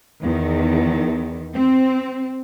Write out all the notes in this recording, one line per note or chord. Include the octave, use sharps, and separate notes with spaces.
E2 D#3
C4